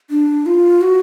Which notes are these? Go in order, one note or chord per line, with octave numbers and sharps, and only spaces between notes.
D4
F4
F#4